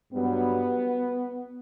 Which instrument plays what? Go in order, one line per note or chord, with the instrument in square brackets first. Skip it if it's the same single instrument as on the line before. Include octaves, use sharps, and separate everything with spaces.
[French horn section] G2 F#3 B3